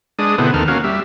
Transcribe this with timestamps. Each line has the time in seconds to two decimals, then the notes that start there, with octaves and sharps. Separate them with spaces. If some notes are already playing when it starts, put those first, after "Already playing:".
0.19 G#3 D4 D#6
0.38 B2 D3 B3 C4 E4
0.54 D#2 D#3 A4 F6
0.68 A#3 C#4 F#4 F5
0.84 G3 E5